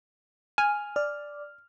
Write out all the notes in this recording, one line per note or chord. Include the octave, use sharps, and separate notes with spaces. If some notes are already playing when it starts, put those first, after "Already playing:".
G#5 F6
D5 F6